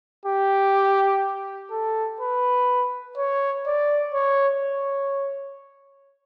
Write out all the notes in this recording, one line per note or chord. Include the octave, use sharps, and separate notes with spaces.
G4
A4
B4
C#5
D5
C#5
C#5